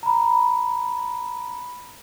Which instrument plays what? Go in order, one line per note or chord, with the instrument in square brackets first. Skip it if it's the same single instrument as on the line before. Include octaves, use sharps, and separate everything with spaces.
[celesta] A#5 B5